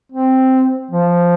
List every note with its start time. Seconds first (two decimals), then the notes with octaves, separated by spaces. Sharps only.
0.12 C4
0.91 F3